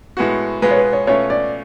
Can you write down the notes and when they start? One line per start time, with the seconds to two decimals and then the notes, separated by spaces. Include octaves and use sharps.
0.17 A2 G#3 B3 F#4
0.62 B2 G#3 B3 F4 B4
0.71 C#5
0.77 B4
0.93 C#5
1.07 B2 A3 C#4 F4 C#5
1.30 D5